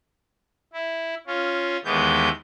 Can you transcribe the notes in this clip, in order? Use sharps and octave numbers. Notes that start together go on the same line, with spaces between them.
E4
C#4 F4
D#2 E3 G#3 B3 G6